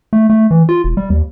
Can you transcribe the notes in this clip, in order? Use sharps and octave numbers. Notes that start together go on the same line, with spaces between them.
A3
A3
E3
F4
E1
G3
D#2